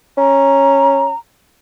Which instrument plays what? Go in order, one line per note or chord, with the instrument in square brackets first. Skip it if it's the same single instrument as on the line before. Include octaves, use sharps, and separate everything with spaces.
[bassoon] C#4 [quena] A#5